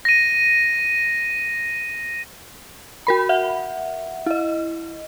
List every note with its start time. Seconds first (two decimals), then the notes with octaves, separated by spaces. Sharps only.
0.05 A#6 D#7
3.07 F#4 A#4 B5
3.29 E5 F#5
4.26 E4 D#5